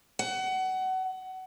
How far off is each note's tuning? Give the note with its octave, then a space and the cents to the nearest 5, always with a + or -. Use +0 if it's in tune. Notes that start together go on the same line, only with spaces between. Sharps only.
F#5 +25